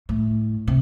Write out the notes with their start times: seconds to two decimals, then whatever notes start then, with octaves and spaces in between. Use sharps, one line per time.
0.09 A2
0.67 C3